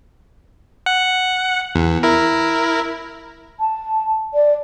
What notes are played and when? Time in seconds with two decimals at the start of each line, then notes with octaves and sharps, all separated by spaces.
0.86 F#5
1.75 E2
2.03 E4 A#4
3.60 A5
4.34 D5